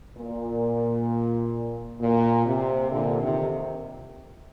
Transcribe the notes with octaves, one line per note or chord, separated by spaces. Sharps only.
A#2
A#2
C3
A#2 D3
C3 D#3